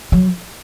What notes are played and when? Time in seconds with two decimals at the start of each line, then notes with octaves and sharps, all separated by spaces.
0.12 F#3